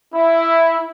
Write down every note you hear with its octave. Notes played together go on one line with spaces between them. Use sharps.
E4